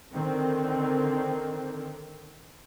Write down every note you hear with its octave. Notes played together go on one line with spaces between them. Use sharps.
D3 D#3 C4